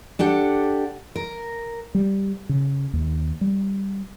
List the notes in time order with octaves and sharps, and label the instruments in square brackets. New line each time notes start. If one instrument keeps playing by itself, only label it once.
[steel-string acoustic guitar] D4 G4 A4 F#5
A#4
[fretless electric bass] G3
C#3
D#2
G3